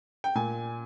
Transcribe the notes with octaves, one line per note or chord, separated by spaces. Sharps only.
G5
A#2 G#5